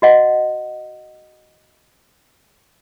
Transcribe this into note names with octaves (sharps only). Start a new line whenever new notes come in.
F#4 D#5 F#5